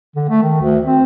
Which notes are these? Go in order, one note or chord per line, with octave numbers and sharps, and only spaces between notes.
D3
A3
D#3
D2
C4